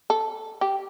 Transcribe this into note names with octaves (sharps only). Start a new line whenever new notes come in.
A4
G4